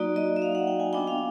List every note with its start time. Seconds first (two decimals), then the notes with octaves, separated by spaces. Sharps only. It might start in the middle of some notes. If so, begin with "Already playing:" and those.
Already playing: F#3 A#3 D#4 F#4 D5
0.16 D#5
0.36 E5
0.42 F5
0.55 F#5
0.67 G5
0.80 G#5
0.93 B3 D4 F4 G5
1.07 F5